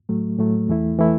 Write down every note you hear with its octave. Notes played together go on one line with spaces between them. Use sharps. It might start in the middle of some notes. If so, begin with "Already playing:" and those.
A2 F#3 A3
A2 F#3 A3
E2 E3 A3 E4
E3 A3 E4